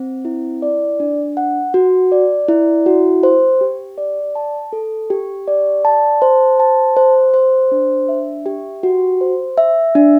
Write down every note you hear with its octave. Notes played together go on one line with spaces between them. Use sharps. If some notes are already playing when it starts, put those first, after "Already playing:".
Already playing: C4
E4
D5
D4
F#5
F#4
D5
E4
F#4
C5
G4
D5
A5
A4
G4
D5
A5
C5
A5
C5
C5
D4
E5
G4
F#4
C5
E5
D4